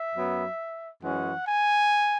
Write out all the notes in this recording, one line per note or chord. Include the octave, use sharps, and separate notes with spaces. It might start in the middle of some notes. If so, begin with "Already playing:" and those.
Already playing: E5
F#2 F#3 B3
F#2 E3 G#3 C#4 F#5
G#5